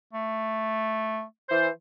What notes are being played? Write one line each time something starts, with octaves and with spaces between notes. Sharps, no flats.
A3
E3 C5